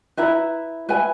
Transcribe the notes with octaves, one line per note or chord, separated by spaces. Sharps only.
E4 B4 E5 A#5
B4 E5 G#5